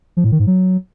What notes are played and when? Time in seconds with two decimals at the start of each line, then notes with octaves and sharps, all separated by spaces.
0.17 F3
0.24 A2
0.32 D#3
0.39 G#2
0.47 F#3